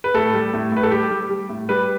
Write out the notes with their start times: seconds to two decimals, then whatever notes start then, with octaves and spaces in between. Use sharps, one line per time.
0.04 B4
0.14 A2 A4
0.34 G3
0.54 A2
0.72 A2 B4
0.83 A4
0.91 G3 G4
1.11 G3
1.30 G3
1.49 A2
1.69 G3 B4